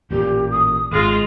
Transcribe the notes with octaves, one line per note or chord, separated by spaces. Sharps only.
A1 A#2 G4
D#6
G#1 G#3 F4 D#5